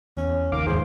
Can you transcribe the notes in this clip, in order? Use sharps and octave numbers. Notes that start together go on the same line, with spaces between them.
E2 C#4
F1 D#2 D#3 A#3 F5 D6
D#2 G#2 D#3 E3 G#4 C5